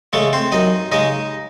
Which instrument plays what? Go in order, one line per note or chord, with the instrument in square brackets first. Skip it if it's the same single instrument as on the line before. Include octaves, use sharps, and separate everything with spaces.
[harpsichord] C#3 G#3 A3 A4
C4 C5
F#2 D#4 D#5
C#3 G#3 D#4 D#5